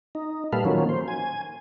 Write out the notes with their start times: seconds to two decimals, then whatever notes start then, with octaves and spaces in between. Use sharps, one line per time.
0.15 D#4
0.53 A#2 G3 A4 B4 F5
0.65 D#3 F3 F#3 A#3 C#4
0.89 C5
1.08 G#5